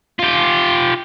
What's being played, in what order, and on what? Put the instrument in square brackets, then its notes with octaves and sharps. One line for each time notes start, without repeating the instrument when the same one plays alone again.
[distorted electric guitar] F4 G4